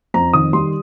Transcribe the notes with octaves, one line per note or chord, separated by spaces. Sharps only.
F2 A#5
D#3 D#6
G3 C6